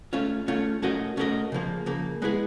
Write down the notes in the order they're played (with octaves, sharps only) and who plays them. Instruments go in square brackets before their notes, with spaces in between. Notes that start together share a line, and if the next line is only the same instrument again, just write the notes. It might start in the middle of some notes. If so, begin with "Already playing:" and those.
[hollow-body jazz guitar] A3 C#4 F4
A3 C#4 F4
A3 C#4 F#4 A#4 D#5
A3 C#4 F#4 A#4 D#5
C#3 F3 A#3
C#3 F3 A#3
G#3 B3 E4 G#4